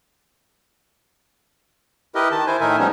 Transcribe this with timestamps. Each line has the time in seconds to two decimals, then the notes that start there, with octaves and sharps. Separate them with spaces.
2.15 E4 G4 A#4 B4 D#5
2.31 D#3 A5
2.47 E4 C5 G#5
2.61 A2 D#3 D#4 A#4 E5 G#5
2.79 F3 G3 G#3 B3 C#4 D#4